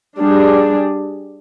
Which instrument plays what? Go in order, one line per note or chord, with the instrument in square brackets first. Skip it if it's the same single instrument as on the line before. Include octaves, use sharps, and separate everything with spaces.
[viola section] G3 D4 G#4